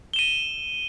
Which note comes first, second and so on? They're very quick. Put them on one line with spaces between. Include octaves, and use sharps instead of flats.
G7 E7 D#7